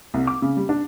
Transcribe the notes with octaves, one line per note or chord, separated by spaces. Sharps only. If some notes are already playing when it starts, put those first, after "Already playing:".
C2
D6
C#3
G3
D4